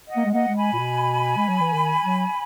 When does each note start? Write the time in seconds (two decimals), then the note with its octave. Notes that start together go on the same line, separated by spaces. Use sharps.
0.08 D#5 F#5
0.16 A#3
0.25 G#3
0.31 A#3 D#5 F#5
0.48 G#3
0.55 G#5 B5
0.73 A#2
0.79 B2
1.37 G#3
1.48 F#3
1.60 E3
1.73 D#3
2.04 F#3